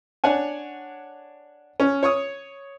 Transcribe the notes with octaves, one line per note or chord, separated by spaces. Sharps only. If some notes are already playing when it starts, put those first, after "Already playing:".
D4 C#5 F#5 G#5
C#4
C#5 C#6 D#6